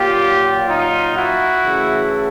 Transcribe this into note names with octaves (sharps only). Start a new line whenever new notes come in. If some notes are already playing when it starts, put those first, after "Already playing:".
Already playing: A#2 F#3 A#3 F4 G4
D#4 F4
E4 F#4
C#3 E3 A3